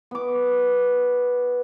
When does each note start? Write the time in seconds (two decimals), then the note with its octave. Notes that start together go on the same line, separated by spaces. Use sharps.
0.11 B3 D6